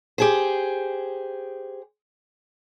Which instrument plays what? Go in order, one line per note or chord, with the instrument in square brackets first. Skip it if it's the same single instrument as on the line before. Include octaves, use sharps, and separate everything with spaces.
[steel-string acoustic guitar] G4 G#4 C5